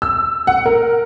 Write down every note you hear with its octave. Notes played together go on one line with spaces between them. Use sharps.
E6
F#5
A#4